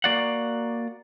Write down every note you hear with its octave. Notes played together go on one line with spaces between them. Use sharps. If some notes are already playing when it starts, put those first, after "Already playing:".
A#3 F#4 D5 F5 F#5